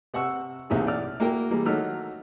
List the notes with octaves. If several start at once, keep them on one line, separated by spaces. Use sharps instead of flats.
C3 F#5 C#6 E6
B1 A2 C3 E3 A#3 G#4
D5 F6
A#3 E4 F#4 A#4 G5
E3 G3 G#3 A#3
D#3 F#3 A3 D#4 F6